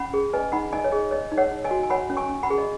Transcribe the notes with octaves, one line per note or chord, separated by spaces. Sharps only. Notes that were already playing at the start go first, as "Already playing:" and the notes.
Already playing: C#4 F#5 B5
G#4
B4 D#5 G#5
D#4 F#5 B5
D#4 D#5 G#5
C#5
G#4 D#5
C#5 D#5
D#4
C#5 F#5
D#4
D#5 G#5
F#4
G#5
C#5 F#5 B5
C#4
G#5 C#6
C#4
F#5 B5
G#4
D#5